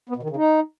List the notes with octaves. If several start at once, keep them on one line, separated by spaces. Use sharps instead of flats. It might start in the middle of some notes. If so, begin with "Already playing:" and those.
B3
B2
D#3
C#3
D#4